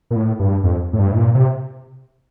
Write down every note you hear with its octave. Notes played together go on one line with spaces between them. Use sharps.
A#2
A2
G2
F2
A2
G2
A2
A#2
C3